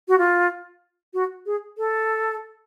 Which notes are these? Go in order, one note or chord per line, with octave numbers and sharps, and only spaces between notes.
F#4
F4
F#4
G#4
A4